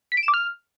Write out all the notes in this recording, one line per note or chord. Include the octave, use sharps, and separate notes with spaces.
B6
D7
E7
D6
F6